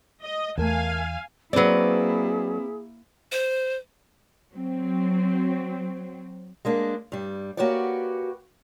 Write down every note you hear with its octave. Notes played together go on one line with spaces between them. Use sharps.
D#5
E2 A3 A#4 F5 G#5 A5
F#3 A#3 C4 E4 G#4 B4 D5
C5
F#3 C4
G#3 A#3 D4
G2 G3
A#3 F#4 G4 B4 C#5 D5